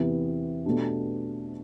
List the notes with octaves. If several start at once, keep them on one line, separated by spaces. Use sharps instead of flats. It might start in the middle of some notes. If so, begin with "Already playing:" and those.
Already playing: E2 C3 E3 B3 E4
B2 A3 D4 G4